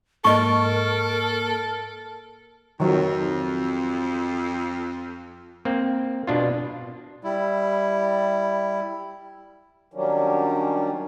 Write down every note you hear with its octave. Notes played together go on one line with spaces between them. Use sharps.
G#2 A#3 A4 A#4 D#5 A5 C#6
F2 D#3 F#3
A#3 C4
B2 D4 F4
G3 E4
D#3 F#3 G3 A#3 C#4 D4